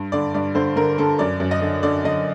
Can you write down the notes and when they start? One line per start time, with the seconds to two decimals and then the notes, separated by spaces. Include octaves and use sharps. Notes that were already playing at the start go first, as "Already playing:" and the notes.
Already playing: G2
0.12 D3 D5
0.34 G2 D5
0.55 D3 C5
0.76 D3 A#4
0.98 D3 A4
1.19 F#2 D5
1.40 F#2
1.51 D#5
1.61 D3
1.83 D3 D5
2.04 D3 D#5